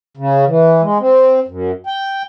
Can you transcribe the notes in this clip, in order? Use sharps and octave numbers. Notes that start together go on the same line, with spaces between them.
C#3
E3
G#3
C4
F#2
G5